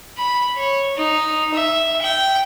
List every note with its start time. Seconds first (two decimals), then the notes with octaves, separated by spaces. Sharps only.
0.18 B5
0.57 C#5
0.96 D#4
1.54 E5
2.01 G5